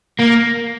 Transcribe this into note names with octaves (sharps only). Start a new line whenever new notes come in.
A#3